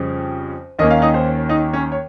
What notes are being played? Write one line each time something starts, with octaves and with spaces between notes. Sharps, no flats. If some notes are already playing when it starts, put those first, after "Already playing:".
Already playing: F2 C#3 G3
D#2 D#3 A#3 C#4 D#5
F5
D#4 D#5
C5
D#4 D#5
C#4 C#5
C#5